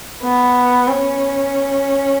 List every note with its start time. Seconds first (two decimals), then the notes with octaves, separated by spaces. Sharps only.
0.24 B3
0.88 C#4